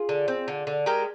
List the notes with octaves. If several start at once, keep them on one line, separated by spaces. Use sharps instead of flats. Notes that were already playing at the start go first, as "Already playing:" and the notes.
Already playing: F4 G#4
D3
C4
D3
D3
G#3 G4 A#4